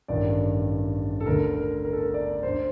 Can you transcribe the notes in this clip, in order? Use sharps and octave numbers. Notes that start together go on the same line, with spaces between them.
A1 G2 D#3 D5
A4
D2 D3 A#4
A#4
A#4
A4
A#4
D5
D2 D3 C5